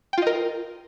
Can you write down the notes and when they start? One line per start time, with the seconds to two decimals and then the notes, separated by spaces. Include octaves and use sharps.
0.13 G5
0.18 F4
0.22 D#5
0.27 A#4